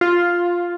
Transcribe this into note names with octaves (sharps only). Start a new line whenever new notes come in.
F4